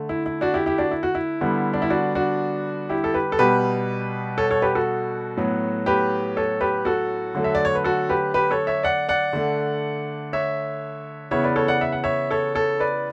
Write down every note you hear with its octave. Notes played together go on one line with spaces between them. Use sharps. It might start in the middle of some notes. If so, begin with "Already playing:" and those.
Already playing: D3 A3
E4
E4
D4 F#4
E4 G4
E4 G4
D4 F#4
E4
F#4
E4
D3 G3 B3
D4
E4
D4 F#4
D4 F#4
E4 G4
A4
G4 B4
A4
B2 G3 B3 G4 B4
A4 C#5
A4 C#5
G4 B4
F#4 A4
A2 F#3 B3
G4 B4
A4 C#5
G4 B4
F#4 A4
D3 F#3 A3
E5
D5
C#5
B4
F#4 A4
G4 B4
G4 B4
A4 C#5
C#5 E5
D5 F#5
D5 F#5
D3 A3
C#5 E5
C#3 E3 B3 C#5 E5
B4 D5
A4 C#5
D5 F#5
E5
F#5
C#5 E5
A4 C#5
A4 C#5
B4 D5